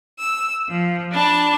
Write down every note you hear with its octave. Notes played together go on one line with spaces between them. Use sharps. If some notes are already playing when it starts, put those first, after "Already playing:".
E6
F3
D4 A5 B5